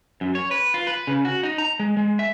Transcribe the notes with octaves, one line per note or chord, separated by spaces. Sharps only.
F#2
C#5
B4
F4
B4
C#3
F#4
D#4
A#5
G#3
G#3
E5